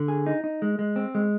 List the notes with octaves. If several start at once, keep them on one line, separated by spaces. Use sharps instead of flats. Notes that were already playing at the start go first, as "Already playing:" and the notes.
Already playing: D3
G#4
D#4
D#4
G#3
G#3
C4
G#3